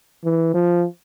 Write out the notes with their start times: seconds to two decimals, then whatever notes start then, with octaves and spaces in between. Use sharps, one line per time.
0.25 E3
0.54 F3